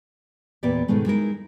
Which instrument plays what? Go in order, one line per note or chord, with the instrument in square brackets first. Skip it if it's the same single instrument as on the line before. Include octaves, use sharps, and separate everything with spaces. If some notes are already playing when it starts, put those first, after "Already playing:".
[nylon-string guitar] E2 A#2 B3 G4 D5 E5
G#2 B2 D#3 G#3 A3
G#3 D#4 E4 A#4